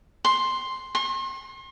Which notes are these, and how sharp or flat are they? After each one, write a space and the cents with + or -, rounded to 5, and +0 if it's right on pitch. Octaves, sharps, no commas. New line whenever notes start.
C6 +5
C6 +40